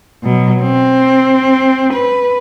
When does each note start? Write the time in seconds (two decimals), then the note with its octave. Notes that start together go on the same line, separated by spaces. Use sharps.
0.24 B2 F#3
0.63 C4
1.93 B4